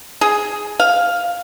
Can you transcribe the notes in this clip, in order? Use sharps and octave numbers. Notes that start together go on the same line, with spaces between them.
G#4
F5